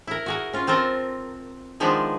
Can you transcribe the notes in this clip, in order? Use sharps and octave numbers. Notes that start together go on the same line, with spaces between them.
E4 A#4
F#4 G#4 A#4
C#4 F4
C4 F4 A4 A#4
D#3 F3 G#3 B3 D4 D#4